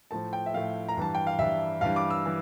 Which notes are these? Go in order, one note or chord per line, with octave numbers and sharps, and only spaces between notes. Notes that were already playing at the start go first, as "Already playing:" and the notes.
A2 F3 A5
G5
E5
A2 F3 F5
A#5
G2 E3 G3 A5
G5
F5
G2 E3 G3 E5
G2 E3 G3 F5
D6
E6
E3 G3